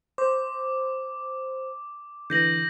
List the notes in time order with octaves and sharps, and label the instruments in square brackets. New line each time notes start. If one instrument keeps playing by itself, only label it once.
[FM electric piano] C5 [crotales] D6
[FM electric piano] D3 E3 [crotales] G6 A#6 F#7